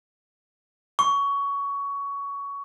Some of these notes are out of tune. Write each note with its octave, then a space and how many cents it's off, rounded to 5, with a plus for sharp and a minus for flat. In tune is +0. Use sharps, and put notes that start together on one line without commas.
C#6 +20